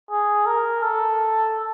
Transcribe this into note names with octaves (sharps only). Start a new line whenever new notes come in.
G#4
A#4
A4